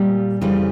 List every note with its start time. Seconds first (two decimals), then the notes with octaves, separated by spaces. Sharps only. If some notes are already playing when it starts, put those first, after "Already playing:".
Already playing: A#2 G3
0.41 F2 C#3 E3 G3